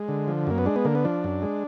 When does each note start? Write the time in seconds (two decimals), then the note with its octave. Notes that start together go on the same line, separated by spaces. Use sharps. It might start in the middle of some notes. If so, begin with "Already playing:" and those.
Already playing: G#3
0.08 D3
0.27 F3
0.47 F#2 A#3
0.58 B3
0.66 G#3 D4
0.76 B3
0.85 D3 A#3
0.95 B3
1.04 F3 D4
1.24 F#2
1.42 G#3